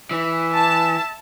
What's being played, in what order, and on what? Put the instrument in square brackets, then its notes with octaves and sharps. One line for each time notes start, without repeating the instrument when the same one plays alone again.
[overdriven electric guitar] E3 [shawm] E5
[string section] A5